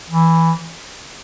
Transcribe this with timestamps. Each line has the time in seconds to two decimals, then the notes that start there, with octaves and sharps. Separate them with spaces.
0.09 E3